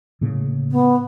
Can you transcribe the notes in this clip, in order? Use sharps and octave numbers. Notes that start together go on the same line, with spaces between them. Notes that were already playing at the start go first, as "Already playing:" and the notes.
A2 C#3 A#3
B3